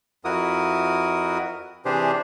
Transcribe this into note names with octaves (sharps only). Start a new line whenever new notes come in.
F2 E4 F#4 A#4 D#6
C3 E3 D4 G4 G#4 C5